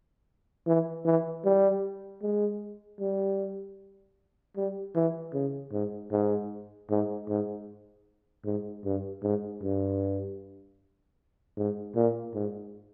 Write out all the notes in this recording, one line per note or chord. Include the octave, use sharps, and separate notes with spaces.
E3
E3
G3
G#3
G3
G3
E3
C#3
G#2
G#2
G#2
G#2
G#2
G2
G#2
G2
G#2
A#2
G#2